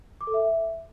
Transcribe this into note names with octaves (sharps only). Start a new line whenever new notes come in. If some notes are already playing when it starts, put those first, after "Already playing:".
D6
A4
E5